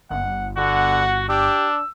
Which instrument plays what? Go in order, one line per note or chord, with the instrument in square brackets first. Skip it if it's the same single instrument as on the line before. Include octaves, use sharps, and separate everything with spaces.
[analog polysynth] G1 [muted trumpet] F#5
[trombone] D3 [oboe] F#4 [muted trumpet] F#5
[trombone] D4 [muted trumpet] G4 [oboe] E6